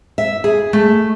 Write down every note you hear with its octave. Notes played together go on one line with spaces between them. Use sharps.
E5
G#4
A3